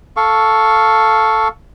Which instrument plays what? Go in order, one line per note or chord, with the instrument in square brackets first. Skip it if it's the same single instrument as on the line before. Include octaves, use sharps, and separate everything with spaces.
[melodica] A4 F5 C#6